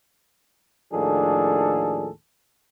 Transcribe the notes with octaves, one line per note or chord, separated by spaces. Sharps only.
D#2 A2 F3 D4 G#4 A4